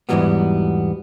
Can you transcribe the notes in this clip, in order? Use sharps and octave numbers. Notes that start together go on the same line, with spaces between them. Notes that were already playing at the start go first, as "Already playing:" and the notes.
E2 G#2 E3 F#3 G3 B3